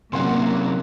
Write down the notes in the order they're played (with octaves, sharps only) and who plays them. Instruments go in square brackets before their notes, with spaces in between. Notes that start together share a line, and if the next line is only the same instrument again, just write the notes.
[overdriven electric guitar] C3 F#3 [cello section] A#3 [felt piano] C#4 F#5 C6